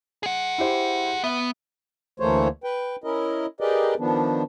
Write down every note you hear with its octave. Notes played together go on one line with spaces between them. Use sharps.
G#4 F#5
E4 G4 C5
B3 E5
D2 E3 A3 A#3 C5 C#5
B4 G5
C#4 E4 A#4 D#5
G4 G#4 A#4 B4 D5 D#5
D#3 F3 B3 D4